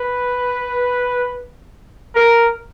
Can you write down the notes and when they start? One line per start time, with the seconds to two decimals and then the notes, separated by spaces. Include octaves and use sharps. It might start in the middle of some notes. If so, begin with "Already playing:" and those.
Already playing: B4
2.15 A#4